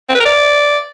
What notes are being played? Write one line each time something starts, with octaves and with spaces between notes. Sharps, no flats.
C4
B4
A#4
D5